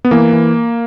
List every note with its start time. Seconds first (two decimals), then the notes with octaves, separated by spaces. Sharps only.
0.05 B3
0.11 E3 A#3
0.33 E3